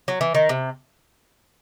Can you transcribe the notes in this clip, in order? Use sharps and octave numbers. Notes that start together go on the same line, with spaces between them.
F#3
E3
D#3
C3